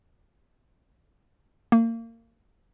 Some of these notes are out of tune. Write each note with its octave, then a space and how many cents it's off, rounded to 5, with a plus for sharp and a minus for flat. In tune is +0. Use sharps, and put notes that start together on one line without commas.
A#3 -30